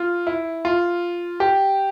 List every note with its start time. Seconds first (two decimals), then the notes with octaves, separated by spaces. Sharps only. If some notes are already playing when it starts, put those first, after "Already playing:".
Already playing: F4
0.27 E4
0.65 F4
1.40 G4